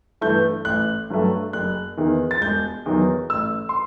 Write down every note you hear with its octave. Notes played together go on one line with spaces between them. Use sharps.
G2 E3 A3 G6
A1 F#6
G2 F#3 A3
F#1 F#6
E2 D#3
A6
E1 G6
E2 D#3 F#3
A1 E6
C6